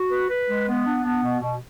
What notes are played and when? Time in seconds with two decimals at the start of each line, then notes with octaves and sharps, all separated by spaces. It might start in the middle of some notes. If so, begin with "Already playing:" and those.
Already playing: F#4
0.10 B4
0.30 B4
0.47 G#3
0.67 B3
0.85 D4
1.04 B3
1.23 B2
1.40 B2